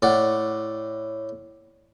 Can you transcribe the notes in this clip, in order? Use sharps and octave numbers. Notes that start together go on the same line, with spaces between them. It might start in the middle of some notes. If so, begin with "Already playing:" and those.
A2 D5 F#5